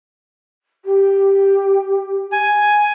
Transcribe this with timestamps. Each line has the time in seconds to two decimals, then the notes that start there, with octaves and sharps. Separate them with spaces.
0.85 G4
2.32 G#5